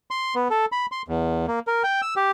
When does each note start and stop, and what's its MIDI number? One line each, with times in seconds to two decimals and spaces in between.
0.11 0.35 84
0.35 0.48 59
0.50 0.65 69
0.72 0.86 83
0.92 1.02 84
1.08 1.46 40
1.48 1.59 58
1.67 1.83 70
1.84 2.01 79
2.02 2.14 88
2.16 2.31 67